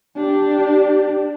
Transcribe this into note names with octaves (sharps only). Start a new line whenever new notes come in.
D4 G4